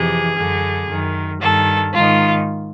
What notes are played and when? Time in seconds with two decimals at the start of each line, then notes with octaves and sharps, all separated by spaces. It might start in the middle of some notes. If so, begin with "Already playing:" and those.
Already playing: F2 C3 E3 G#4
0.35 F#2 D3
0.88 F#2 D#3
1.40 G2 D#3 A4
1.92 G#2 D#3 F4